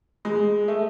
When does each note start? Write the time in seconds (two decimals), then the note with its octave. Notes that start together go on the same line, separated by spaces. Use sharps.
0.25 G#3
0.68 A3